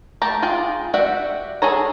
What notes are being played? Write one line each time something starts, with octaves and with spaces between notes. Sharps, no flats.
A3 G4 A5 A#5
F4 G#4 G5
F#4 G4 D5 E5 F#5
G#4 A4 C#5 A#5